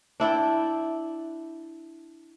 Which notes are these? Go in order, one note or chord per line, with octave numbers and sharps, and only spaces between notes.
D4 E4 D5 G5